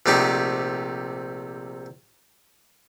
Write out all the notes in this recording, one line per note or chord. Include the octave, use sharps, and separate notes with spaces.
A#1 C3 A3 D#4 G4